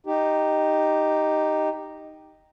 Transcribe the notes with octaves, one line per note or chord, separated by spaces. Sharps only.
D#4 G4